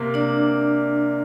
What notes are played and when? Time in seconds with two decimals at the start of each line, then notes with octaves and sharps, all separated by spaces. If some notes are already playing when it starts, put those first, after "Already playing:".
Already playing: C3 A#3
0.14 D4 D5